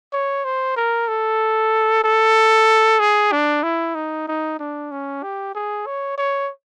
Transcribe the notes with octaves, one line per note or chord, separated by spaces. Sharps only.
C#5
C5
A#4
A4
A4
G#4
D4
E4
D#4
D#4
D4
C#4
G4
G#4
C#5
C#5